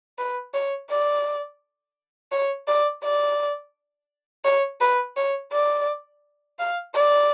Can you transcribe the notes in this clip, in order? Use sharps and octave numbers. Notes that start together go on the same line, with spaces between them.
B4
C#5
D5
C#5
D5
D5
C#5
B4
C#5
D5
F5
D5